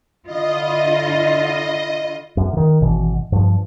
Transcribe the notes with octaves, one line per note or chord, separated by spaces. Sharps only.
D3 E4 F4 D#5
F#2
D3 D#3
G#1 B2 E3
G2 F3